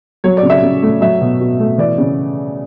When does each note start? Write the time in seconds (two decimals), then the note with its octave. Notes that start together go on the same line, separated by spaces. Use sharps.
0.24 F#3 C#5
0.37 D5
0.43 C#3
0.50 E5
0.63 C#3
0.82 A3
1.01 F#3 E5
1.21 B2
1.41 B2
1.60 A3
1.78 E3 D5
1.98 C#3